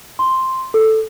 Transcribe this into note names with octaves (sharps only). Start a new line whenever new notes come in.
C6
A4